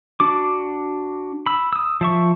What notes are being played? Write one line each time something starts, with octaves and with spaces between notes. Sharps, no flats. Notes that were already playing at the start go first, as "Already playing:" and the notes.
D4 F#4 D6
B5 E6
D#6 E6
F3 E5 C#6